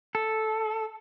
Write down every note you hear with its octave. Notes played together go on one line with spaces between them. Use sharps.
A4